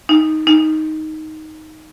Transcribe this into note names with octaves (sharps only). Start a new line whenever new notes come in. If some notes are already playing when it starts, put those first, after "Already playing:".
D#4
D#4